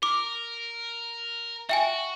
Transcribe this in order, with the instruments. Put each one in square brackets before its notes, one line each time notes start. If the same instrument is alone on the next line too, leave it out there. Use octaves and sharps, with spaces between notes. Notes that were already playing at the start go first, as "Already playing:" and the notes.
[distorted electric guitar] A#4 [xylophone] D6
[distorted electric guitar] F#4 [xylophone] E5 G5 G#5